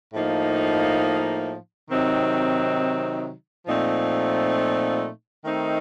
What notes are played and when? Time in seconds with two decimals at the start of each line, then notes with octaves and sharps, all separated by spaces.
0.13 A2 F3 A#3 D#4
1.90 C3 D#3 F#3 C4 D#4
3.66 A#2 F3 A3 C4 D#4
5.43 D#3 A3 C4 D#4